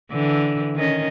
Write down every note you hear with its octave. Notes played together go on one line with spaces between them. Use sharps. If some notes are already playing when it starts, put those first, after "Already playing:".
D3 E3
D#3 C#4 D#5